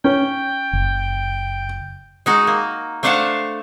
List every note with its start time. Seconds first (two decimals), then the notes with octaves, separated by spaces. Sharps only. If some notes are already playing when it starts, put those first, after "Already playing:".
0.04 C#4 G5
0.73 F#1
2.26 G#3 D#4 F#4
2.47 A#3
3.03 A3 D4 C5 F5 F#5 A5